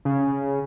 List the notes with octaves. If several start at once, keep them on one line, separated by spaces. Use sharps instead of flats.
C#3